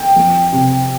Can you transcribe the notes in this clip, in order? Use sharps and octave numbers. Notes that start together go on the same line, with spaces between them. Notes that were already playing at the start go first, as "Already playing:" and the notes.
Already playing: G5
F2
C3